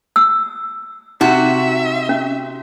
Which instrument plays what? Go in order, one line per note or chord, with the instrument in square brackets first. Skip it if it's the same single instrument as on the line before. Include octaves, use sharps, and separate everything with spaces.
[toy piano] E6
[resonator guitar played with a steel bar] C3 F#4 [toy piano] D#4 [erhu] E5
[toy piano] C#4